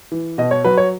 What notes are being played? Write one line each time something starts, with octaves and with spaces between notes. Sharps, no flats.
E3
B2 D#5
C#5
F#3 B4
C#5